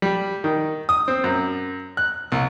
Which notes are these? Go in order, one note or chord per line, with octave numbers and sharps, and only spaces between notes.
G3
D#3
D#6
C4
F#2
F#6
C2